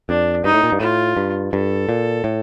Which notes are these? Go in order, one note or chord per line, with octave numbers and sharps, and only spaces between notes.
F2 D4
G2 D#4
A2
A#2
G2
A2 F4
G2
G2 A4
A#2
A2